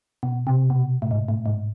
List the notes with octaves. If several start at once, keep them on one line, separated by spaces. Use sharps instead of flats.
B2
C3
B2
A2
G#2
A2
G#2